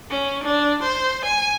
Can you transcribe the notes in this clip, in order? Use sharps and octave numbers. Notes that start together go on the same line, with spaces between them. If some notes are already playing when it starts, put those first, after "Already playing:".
C#4
D4
C5
G#5